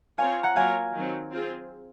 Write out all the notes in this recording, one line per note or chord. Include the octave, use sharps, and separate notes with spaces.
C4 F4 A#4 C#5 F5 G#5
F#5 A#5
F#3 A#3 F4 A#4 C#5 F5 G#5
D#3 F#3 C4
C4 F4 G#4